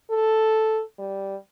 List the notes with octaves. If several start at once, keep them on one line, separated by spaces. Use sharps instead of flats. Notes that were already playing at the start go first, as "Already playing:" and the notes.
A4
G3